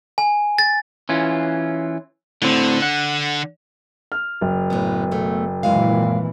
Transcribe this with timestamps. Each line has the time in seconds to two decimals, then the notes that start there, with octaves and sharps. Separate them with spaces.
0.18 G#5
0.58 A6
1.09 E3 C#4 F4
2.42 A2 D3 C4
2.82 F#5
4.12 F6
4.41 F#1
4.70 A2 B3
5.11 B2 A3
5.63 G#1 F#2 A#2 E3 G#3 F5